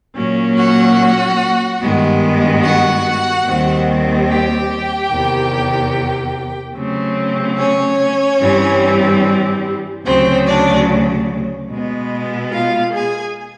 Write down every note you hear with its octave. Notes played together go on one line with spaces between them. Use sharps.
A#2 F#3 A#3 C#4
F#4 F#5
G2 D#3 G#3 B3
F#4 F#5
D#2 D#3 G3 C4
G4 G5
E2 C3 D#3
C#3 F#3 A3 C4
C#4 C#5
G2 E3 G3 C4
D2 C#3 F#3 A3 C4 C5
D4 D5
B2 G#3 B3
F4 F5
G#4 G#5